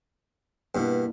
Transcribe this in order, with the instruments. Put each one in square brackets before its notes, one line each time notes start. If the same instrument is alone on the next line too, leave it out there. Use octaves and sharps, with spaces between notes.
[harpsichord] G2 B2 [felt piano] A#3 D4 E4